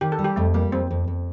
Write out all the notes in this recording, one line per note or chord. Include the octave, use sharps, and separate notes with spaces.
D#3 G4
A4
G3
G4
F2 A3
G3 A#3
F2 C4
F2
F2